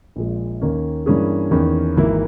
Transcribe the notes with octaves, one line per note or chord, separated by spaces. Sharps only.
A#1 A#2 G#3
D#2 D#3 A#3 C#4
G2 E3 A#3 C#4 G#4
E2 D#3 A#3 C#4
G#1 G#2 E3 A#3 E4